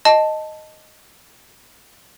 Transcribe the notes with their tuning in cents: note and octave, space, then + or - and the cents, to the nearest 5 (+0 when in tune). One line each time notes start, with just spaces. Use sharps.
D#5 +0 A5 +0